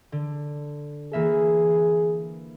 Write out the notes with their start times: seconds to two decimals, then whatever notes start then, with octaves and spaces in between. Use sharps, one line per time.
0.12 D3
1.13 E3 A#3 G#4 E5